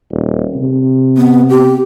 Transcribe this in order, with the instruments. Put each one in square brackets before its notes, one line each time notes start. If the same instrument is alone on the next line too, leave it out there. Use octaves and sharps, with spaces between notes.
[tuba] D#1
C3
[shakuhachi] B3
G4